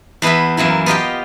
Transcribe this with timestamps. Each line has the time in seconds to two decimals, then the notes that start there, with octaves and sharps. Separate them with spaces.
0.22 E2 B3 E4 B4 E5
0.57 F#2 E3 A#3 E4
0.86 B3 F4 G4 D#5 F5 G5